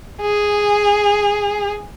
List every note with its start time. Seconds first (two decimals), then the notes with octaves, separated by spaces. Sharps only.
0.21 G#4